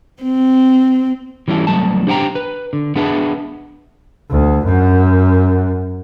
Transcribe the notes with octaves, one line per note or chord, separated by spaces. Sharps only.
C4
E3 G3 C#4 E4 A4
C2 F2 F#3 A3 A5
D4 G4 C5 F#5 G5 A#5
B4
D3
B3 D4 G#4 B4 E5 A5
D2
F#2